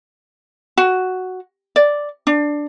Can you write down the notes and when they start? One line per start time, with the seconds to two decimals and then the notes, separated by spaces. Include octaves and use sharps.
0.78 F#4
1.76 D5
2.27 D4